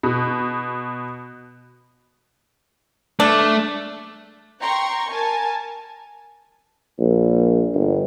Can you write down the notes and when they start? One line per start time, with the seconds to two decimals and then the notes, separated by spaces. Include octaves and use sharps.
0.03 B2
3.20 A3 D4
4.60 G5 A#5 C6 C#6
5.10 A#4 G#5 A5
6.99 A#1
7.74 G1